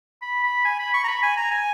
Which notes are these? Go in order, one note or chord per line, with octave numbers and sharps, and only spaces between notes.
B5
B5
G#5
B5
C#6
A#5
B5
G#5
A#5
G#5